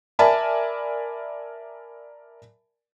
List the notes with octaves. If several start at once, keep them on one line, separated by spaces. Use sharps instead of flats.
A#4 D5 E5 G#5 A5 B5